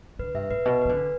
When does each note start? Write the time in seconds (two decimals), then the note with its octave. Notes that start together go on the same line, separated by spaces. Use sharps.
0.19 D3 B4
0.34 G2 E5
0.50 A2 B4
0.65 B2 B4
0.81 E3 B4
0.89 D3
0.97 D4